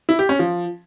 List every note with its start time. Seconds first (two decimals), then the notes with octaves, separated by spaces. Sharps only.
0.09 E4
0.19 G4
0.29 C#4
0.39 F3